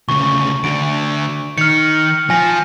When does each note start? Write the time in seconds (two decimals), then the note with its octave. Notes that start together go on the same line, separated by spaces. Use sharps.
0.09 D2 C#3 C#6
0.64 D2 D3 D7
1.58 D#3 F6 C#7
2.30 F3 G#5 A#6